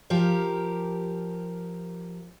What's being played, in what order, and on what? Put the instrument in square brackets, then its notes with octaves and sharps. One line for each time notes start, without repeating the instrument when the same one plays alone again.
[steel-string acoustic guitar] F3 G4 A#4